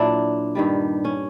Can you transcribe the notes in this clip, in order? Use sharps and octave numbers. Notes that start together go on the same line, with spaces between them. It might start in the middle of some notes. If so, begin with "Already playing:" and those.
Already playing: A#2 F#3 D4 E4
G2 D#3 G3
C#4